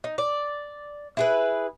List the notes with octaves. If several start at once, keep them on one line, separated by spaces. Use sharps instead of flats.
D#4
D5
E4 G#4 B4